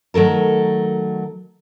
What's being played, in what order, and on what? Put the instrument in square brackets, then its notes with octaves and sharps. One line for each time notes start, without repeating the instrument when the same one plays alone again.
[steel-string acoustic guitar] D#3 F#3 A3 A4 A#4